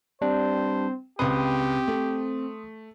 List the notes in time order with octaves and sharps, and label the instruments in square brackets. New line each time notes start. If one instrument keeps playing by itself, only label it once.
[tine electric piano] G3 D4 [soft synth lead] C4 [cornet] C5
[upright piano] C#2 B4 [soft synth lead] C4 [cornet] G4 [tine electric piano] C6 D#6
[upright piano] A3